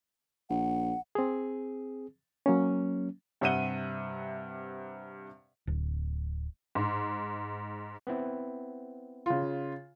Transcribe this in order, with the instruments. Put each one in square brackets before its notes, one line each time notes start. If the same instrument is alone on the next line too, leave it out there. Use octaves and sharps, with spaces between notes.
[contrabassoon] A#1 [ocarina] F#5
[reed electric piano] C4 G#4
F#3 A#3 C#4
[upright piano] G2 C3 E5 F#5 D#7 G7
[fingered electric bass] D1
[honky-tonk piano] G#2
[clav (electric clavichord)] B3 C4 E4
[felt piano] C#3 F4